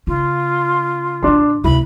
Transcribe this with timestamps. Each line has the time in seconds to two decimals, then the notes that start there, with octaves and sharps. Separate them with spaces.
0.07 C#3 F4
1.23 A#2 D3 D4 C6
1.64 D2 C3 E4 B5